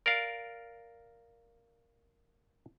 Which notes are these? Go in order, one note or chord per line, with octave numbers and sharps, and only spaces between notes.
A#4 D5 F5